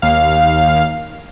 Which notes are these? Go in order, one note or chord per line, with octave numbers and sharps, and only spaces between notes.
D#2 F5